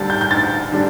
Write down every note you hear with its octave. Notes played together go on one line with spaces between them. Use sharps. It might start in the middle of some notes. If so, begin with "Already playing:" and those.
Already playing: D2 D3 G3 D4 A6
G6
G6
D2 A6
D3 G3 D4